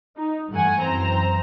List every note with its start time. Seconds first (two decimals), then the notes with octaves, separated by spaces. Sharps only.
0.17 D#4
0.51 G2 E3 A3 F#5 G#5
0.81 F#2 E3 C4 C5 A#5